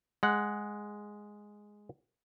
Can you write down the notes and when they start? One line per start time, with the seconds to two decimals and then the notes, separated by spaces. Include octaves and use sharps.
0.23 G#3 F#5